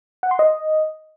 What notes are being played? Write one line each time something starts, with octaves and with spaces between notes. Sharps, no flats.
F#5
C6
D#5